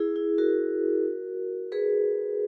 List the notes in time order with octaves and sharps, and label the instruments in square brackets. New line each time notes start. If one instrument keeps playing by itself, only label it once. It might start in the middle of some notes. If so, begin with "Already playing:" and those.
Already playing: [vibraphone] E4 G#4
E4 G#4
F#4 A#4
G#4 B4